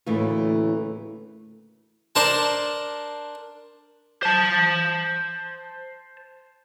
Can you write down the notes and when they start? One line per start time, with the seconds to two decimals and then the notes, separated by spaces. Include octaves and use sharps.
0.06 D2 A2 C#3 E3 A3 A#3
2.15 D4 A#4 C5 A5
4.23 C5 A5